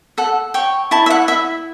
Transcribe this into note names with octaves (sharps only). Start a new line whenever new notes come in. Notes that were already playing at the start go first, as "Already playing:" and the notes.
A4 F#5
C#5 G5
E4 A5
E5
F#5
E4 E5